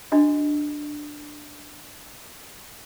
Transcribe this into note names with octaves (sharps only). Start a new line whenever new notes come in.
D4 F#4 D#5